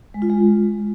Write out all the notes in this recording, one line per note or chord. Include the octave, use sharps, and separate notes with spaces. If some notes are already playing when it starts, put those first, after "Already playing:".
G#3
F4
G#3